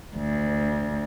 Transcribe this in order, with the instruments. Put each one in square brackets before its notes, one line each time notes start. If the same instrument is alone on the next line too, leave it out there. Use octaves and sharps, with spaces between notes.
[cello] D2